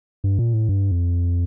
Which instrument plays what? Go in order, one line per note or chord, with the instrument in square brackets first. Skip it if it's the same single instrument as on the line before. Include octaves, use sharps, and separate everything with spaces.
[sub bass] G2
A#2
A2
G2
F2